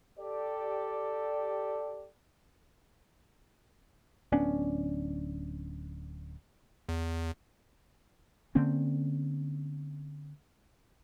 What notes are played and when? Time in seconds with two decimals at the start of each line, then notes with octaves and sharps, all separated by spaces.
0.18 G4 A4 D5
4.32 D1 B3 C#4 D4
6.89 E2
8.55 D3 A#3 C4 C#4